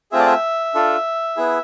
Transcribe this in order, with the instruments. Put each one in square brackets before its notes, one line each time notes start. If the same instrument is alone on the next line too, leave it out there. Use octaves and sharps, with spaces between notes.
[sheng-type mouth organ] A3 C4 F4 G#4 E5
D5
E5
D4 F4 A4
B3 E4 G#4